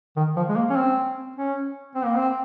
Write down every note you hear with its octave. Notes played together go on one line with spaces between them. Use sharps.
D#3
F3
G#3
A#3
C#4
C4
C#4
C4
A#3
C4